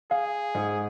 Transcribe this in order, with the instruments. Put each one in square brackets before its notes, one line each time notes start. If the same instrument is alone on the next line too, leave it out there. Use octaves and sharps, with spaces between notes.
[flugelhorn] G#4 [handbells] F5
[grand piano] G#2